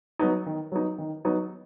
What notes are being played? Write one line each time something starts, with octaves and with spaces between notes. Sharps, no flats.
F#3 B3 D#4
D#3
F#3 B3 D#4
D#3
F#3 B3 D#4